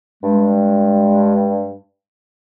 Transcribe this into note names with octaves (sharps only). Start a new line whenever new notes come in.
G2 G#3